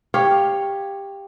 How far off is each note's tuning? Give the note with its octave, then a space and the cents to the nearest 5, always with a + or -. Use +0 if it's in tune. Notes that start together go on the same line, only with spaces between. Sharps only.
G4 +10 C#5 +0 F5 +0